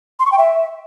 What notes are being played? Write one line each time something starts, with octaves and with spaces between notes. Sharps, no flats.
C6
C#6
G5
E5